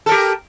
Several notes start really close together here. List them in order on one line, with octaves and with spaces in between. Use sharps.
A4 A#4 G4